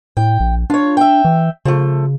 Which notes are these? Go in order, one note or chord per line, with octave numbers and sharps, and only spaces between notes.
A2 G5
A#1
D4 F4 C#5
E5 F#5 G5
E3
C#3 F3 A3